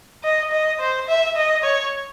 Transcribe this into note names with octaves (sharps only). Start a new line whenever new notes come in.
D#5
D#5
C5
E5
D#5
C#5